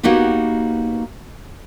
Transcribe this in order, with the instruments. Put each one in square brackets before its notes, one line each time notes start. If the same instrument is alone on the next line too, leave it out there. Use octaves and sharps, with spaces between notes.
[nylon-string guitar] A#3 B3 D#4 F#4 G4